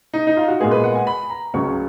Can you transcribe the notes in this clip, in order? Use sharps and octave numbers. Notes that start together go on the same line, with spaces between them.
D#4
D#4
F4
F#4
A#2 G#3 B3 G#4
B4
F#5
G#5
B5
A#5
C#2 C#3 F#3 C#4 C#6